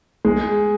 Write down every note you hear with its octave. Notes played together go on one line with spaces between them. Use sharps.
G#3